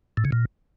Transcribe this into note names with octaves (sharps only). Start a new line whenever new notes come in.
A2
C#3
A#2